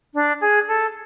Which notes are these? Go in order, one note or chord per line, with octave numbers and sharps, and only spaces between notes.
D4
G#4
A4